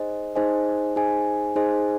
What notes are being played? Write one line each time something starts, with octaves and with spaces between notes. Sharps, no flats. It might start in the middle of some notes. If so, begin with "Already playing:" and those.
Already playing: D#4 G#4 C5 D#5 G#5
D#4 G#4 C5 D#5 G#5
D#4 G#4 C5 D#5 G#5
D#4 G#4 C5 D#5 G#5